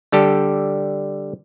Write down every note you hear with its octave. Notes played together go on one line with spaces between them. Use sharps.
D3 G3 G4 A4